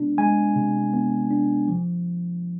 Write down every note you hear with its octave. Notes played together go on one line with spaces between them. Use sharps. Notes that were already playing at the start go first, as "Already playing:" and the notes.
Already playing: C3 G#3 B3 D4
G#3 G#5
C3
B3
D4
F3